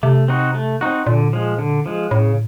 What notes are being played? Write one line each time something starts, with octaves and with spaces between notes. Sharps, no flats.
C3 A3
C4 D#4 F#4
A3
C4 D#4 F#4
A#2 D3
F3 G#3
D3
F3 G#3
A2 C#3